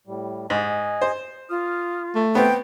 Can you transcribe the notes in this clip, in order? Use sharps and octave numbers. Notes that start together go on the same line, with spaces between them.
A2 G3
G#2 D#5 G#5
C5
F4 D#6 F6
A3
E3 B3 C4 G5